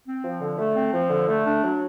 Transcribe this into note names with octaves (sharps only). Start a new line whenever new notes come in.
C4
F3
D3
A3
C4
F3
D3
A3
D4
F#3